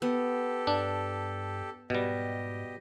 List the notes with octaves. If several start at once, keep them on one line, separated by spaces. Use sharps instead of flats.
B3 G4 A4
G2 D4
G#2 B2 G3 G4 D#5